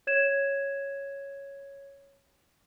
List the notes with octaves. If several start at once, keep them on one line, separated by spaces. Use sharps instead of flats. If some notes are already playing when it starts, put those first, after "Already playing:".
C#5 G#6 E7